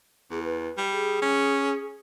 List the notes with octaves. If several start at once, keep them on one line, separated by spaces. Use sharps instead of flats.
E2 G#4
B4
G3
G#4
C#4